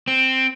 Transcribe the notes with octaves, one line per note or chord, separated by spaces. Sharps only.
C4